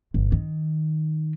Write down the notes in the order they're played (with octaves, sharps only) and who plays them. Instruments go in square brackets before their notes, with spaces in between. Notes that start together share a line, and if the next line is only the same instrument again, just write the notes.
[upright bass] G1
D#3